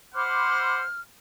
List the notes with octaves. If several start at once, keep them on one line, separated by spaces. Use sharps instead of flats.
C5 F#5 B5 C6 D6 F6